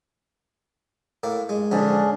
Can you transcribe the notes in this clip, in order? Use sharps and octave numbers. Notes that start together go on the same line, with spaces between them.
A2 A#3
G2 G#3
A#1 G#2 D3 C#4 D4 G#4